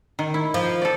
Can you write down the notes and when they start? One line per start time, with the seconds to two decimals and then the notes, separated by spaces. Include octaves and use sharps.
0.19 D#3
0.34 E4
0.54 F3
0.81 A4 D5